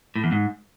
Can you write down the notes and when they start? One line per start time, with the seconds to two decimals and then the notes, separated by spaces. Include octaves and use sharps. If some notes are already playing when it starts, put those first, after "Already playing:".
0.16 A2
0.24 E2
0.32 G#2